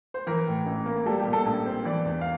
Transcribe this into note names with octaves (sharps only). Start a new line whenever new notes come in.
C5
E3 A#4
A2
A1
A#3
G3 A4
G4
A#2
A4
A#1
C4
E3 D5
E2
F5